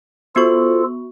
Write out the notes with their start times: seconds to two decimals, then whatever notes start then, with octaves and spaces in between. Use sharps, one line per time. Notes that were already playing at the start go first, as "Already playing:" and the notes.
0.36 B3 F4 F#4 A4 C5 C#6